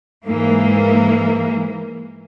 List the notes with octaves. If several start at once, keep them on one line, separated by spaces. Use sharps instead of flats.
G#2 E3 A#3